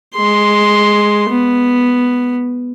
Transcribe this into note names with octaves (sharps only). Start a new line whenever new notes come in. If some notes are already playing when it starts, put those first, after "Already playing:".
G#3 C6
B3